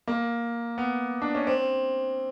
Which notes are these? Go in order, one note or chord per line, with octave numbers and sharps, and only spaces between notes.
A#3
B3
D4
C#4
C4